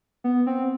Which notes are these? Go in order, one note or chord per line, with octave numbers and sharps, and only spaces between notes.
B3
C4